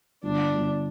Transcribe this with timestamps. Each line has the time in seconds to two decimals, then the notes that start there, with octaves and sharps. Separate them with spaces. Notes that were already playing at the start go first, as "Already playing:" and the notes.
0.23 G1 D4
0.53 G1